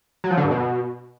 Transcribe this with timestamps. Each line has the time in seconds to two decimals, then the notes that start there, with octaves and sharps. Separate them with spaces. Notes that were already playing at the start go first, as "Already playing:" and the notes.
0.24 F#3
0.31 F3
0.37 D3
0.44 G2
0.51 B2